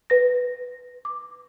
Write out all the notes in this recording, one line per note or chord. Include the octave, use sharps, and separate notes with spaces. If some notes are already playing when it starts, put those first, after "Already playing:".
B4 A#6
D6